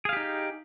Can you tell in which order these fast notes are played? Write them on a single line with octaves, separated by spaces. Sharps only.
G#4 F5 G4 D#4